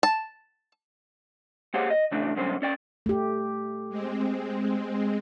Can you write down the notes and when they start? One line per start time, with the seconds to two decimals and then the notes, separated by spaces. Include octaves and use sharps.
0.03 A5
1.74 A#3 G4 G#4 C5 C#5 F#5
1.90 D#5
2.12 C#3 E3 A3 D4
2.36 G2 B2 D3 F#3 C#4 C5
2.62 C#4 D5 G5
3.06 A3 G4
3.90 G#3 C4